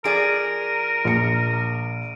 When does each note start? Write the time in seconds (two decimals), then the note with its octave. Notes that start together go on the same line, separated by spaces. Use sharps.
0.04 F3 G#4 A#4 D5 D7 D#7
1.05 A#1 C#7